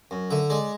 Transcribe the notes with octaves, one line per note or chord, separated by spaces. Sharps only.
F#2
D3 E5
G#3 D5